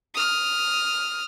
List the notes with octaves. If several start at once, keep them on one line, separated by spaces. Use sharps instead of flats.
D#6 F6